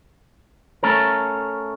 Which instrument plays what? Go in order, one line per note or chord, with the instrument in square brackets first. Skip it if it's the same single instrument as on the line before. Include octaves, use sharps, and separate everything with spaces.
[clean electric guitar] A3 C#4 A4 A#4